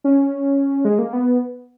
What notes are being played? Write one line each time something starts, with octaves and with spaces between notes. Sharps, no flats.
C#4
G#3
A#3
B3